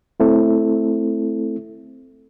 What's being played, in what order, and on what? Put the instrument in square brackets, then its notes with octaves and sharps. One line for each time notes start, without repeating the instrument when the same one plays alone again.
[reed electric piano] A3 C4 E4 A4